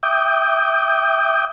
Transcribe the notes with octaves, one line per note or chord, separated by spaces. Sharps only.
E5 G5 D6 D#6 G6